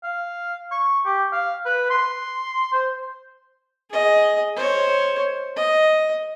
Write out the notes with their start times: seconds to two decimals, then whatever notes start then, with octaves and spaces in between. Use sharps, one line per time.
0.04 F5
0.72 C#6
1.06 G4
1.32 F5
1.66 B4
1.90 C6
2.73 C5
3.90 G#4 D#5
4.56 C5 C#5
5.56 D#5